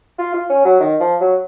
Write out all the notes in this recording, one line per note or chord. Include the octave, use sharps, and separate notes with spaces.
F4
F4
C#4
F#3
D#3
F3
F#3